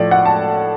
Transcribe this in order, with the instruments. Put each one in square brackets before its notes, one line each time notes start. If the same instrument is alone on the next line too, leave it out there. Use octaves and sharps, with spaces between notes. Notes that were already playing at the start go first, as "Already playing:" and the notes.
Already playing: [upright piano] A2 F3 D5
F#5
A5